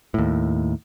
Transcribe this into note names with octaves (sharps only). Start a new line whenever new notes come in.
D#2 A2